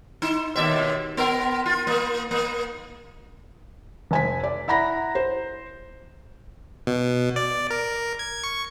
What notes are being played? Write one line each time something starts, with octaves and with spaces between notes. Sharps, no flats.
D#4
D#2 B2 E5
B3 A#4
F4
A#3
A#3
F1 G#5 B6
D5
E4 F#5 A#5 B5 A#6
C5
B2
D5
A#4
G#6
C#6